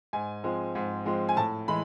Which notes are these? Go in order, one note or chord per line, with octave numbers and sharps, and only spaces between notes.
G#2 G#5
F3 G#3 C4
G#2
F3 G#3 C4
G#5
A2 A5
E3 G#3 B5